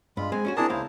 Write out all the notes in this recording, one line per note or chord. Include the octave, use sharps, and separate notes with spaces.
G2 G#3 F4 B5
G#3 C4 G#5
C#4 D#4 F#4
C4 D4 E4 G#4 A#4 A5
C#2 A#3 E4 C5 F5